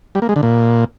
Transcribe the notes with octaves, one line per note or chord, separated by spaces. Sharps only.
G3
A#3
G#3
D3
A#2